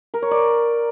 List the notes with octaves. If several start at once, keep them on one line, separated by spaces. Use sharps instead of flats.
A#4
C#5
D5